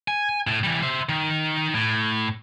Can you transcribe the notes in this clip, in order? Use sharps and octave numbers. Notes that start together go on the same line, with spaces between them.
G#5
A2
E3 G3
C5 E5
D#3
A2